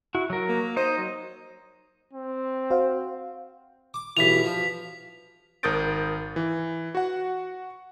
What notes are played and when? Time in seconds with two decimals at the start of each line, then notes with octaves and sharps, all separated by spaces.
0.15 E4 F#4
0.30 F#3 A#4
0.48 A#3
0.76 D#4 C5 D#5
0.97 F#3
2.13 C4
2.70 F#4 C5 F5
3.94 D6
4.17 B1 G2 E3 B6 F7
4.44 F3
5.63 G#1 A#4 D#6 G6 A6 D7
6.36 E3
6.95 F#4 F#5